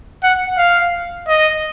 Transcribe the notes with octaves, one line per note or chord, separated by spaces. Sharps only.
F#5
F5
D#5